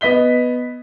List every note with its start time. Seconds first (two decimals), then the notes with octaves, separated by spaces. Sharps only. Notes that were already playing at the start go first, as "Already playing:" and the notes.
0.01 B3 D#5 B6 G7